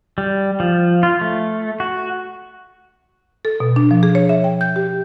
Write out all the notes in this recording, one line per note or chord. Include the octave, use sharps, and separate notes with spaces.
G3
F3
F4
A3
F#4
A4
B2
D4
F3
G#4
C#5
E5
G5
G6
G4